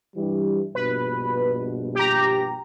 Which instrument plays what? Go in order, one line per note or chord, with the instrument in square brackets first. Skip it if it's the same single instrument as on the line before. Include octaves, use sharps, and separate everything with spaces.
[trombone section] G2 E3 G3
[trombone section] A#1 G2 B2 [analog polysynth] B4
[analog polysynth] G4 A#5